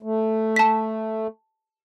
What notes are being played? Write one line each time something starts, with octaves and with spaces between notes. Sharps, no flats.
A3
A5 B6